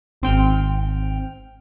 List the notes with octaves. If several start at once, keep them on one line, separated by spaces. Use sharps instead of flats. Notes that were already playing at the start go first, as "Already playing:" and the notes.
G#1 C4 G5 F6